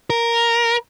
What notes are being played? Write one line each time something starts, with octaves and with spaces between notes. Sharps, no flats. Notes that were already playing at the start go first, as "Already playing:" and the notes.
A#4